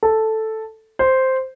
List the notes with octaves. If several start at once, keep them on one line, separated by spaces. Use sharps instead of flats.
A4
C5